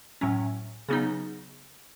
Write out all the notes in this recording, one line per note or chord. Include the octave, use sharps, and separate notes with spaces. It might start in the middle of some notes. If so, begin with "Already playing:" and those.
A2 F#3 C#4
C#3 F#3 B3 D#4